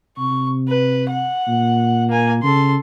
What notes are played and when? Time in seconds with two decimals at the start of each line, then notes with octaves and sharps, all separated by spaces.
0.18 C3 C#6
0.68 B4
1.09 F#5
1.48 A#2
2.09 A#3 G#5
2.43 C#3 A4 C6